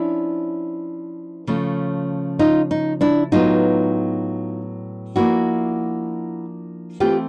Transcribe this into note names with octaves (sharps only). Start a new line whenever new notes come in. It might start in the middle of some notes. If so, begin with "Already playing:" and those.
Already playing: F3 C#4 D4 E4
C#3 F3 A3 C#4
D#4 F4
D#4
D4 E4
A2 F#3 B3 D#4 F4
F3 A#3 D4 E4 F#4
E3 A3 C4 F4 G4